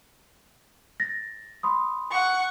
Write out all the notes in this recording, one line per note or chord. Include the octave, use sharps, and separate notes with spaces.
A6 A#6
B5 C6 D#6
F#5 C#6